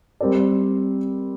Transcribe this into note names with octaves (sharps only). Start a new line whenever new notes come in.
G3 C4 G4 A#4 D5